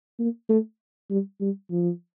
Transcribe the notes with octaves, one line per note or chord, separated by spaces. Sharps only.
A#3
A3
G3
G3
F3